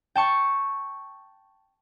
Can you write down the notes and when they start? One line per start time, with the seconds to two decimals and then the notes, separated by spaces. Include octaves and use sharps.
0.15 G5 A5 C#6